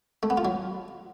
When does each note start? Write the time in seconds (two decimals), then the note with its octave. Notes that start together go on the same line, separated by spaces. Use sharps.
0.23 A3
0.30 B3
0.37 F4
0.45 F#3